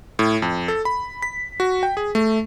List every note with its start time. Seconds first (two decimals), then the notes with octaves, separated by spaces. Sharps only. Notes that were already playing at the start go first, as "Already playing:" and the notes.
0.19 A2
0.42 F2
0.68 A4
0.85 B5
1.22 B6
1.60 F#4
1.83 G5
1.97 G#4
2.15 A3